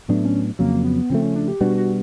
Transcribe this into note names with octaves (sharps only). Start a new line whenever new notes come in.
A2 F#3 A3 B3 D4
C#4
F2 C#3 F#3 A#3
B3
C#3 F3 A3 C4
C#4
D4
G4
B2 G3 B3 D4 F#4
F#4